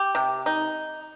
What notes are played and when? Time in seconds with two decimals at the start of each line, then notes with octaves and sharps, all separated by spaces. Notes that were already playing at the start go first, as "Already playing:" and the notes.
Already playing: G4
0.15 C3
0.46 D#4